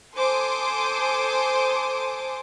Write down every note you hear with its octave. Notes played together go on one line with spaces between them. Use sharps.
A4 C5 G#5 C6 D6 D#6